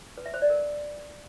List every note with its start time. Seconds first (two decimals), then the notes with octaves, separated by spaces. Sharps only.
0.18 B4
0.26 E5
0.34 C5
0.42 D5
0.50 A#4